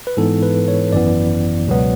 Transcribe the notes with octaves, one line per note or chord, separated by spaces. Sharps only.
B4
G#2 E3 B3 A4
B4
C#5
G#1 F#2 E3 B3 D5
C#2 B2 F#3 B3